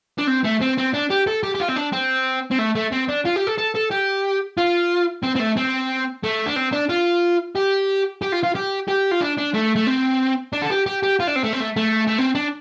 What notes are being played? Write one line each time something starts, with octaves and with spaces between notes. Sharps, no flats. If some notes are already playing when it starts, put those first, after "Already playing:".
D4
C4
A3
C4
C4
D4
G4
A4
G4
G4
F4
C4
D4
C4
C4
A3
A3
C4
D4
F4
G4
A4
A4
A4
G4
F4
C4
C4
A3
C4
A3
D4
C4
D4
F4
G4
G4
F4
F4
G4
G4
F4
D4
D4
A3
A3
C4
D4
A4
G4
G4
G4
F4
D4
C4
A3
C4
A3
A3
A3
C4
D4